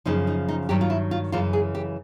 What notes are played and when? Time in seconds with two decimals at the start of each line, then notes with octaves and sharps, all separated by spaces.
0.05 F#2 C#3 F3 D#4
0.27 D#4
0.48 D#4
0.69 G2 D#3 F#3 G4
0.81 F4
0.90 E4
1.11 F4
1.32 F#2 C#3 E3 F4
1.53 G#4
1.75 G4